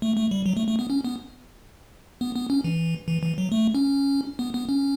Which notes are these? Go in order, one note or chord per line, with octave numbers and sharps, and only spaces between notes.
A3
A3
G3
F#3
A3
A3
B3
C#4
B3
B3
B3
C#4
E3
E3
E3
F#3
A3
C#4
B3
B3
C#4